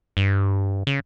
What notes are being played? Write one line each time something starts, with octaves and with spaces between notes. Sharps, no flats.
G2
C#3